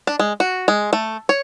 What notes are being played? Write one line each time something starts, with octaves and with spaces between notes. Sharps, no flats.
D4
G#3
F#4
G#3
A3
C#5